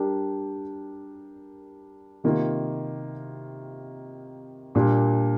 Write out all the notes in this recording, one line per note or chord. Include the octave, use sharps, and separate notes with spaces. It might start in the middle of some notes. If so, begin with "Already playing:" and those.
Already playing: G3 D4 G4 A#4
C3 D#3 A#3 F4
A#2 G3 A#3 D4